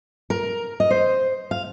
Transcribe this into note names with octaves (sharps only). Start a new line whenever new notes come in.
A#4
D#5
C5
F5